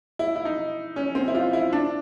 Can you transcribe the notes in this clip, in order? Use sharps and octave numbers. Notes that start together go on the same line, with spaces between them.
E4
E4
D#4
C#4
C4
E4
F4
E4
D4